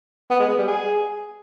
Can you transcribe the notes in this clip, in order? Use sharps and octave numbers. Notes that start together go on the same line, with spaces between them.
B3
G#3
B3
G3
G#4